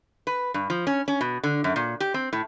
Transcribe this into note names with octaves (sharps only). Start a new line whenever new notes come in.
B4
G2
F3
C#4
C#4
B2
D3
F#2
A#2
G4
C4
A2